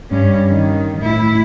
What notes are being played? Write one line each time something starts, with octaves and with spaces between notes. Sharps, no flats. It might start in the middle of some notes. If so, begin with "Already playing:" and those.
G2 C#4
D#3
A2 E4